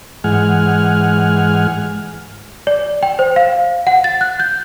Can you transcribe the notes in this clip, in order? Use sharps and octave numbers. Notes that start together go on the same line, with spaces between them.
G#2 E3 G#3 F#5 G#5 F6
D5
G5
C5
F5
F#5
A6
F#6
G6